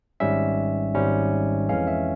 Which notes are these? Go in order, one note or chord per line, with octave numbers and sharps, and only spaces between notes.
G#1 G#2 G3 C#4 E5
G#1 G#2 G3 C#4
F2 E3 G#3 C#4 F5
E5